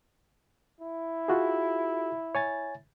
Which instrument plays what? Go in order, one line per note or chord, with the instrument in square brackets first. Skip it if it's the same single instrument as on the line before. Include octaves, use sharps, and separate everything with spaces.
[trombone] E4
[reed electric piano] F4 F#4 G#4
C#5 G#5 A6